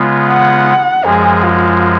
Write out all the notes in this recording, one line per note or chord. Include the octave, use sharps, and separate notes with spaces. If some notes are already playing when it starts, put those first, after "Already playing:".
Already playing: C#3 G#3 B3 F4
F#5
F#2 F3 G#3 G#4
F4